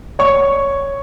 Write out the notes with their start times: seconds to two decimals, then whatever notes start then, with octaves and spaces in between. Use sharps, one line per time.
0.19 C#5 C#6